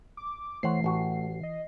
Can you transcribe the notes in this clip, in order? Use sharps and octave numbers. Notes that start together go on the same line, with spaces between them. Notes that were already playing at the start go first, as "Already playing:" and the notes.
D6
E3 A3 C5 C#5 F#5 C7
A1 F#4
D#5